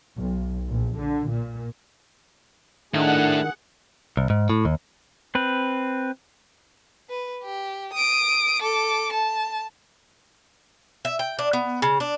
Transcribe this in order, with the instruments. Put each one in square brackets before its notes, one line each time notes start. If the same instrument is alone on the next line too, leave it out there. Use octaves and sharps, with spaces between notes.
[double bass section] B1
A#1
D3
A#2
[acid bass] D#3 [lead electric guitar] A3 E4 [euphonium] D4 [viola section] G#4 F#5
[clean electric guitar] C2
G#2
A2
D#2
[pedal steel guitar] C4 B4
[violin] B4
G4
D#6 D7
A4 D6
A5
[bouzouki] E5
G5
D4
B3
C#3
D4